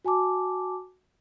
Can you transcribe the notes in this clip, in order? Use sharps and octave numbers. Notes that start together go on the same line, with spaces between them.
F#4 G#5 A5 D6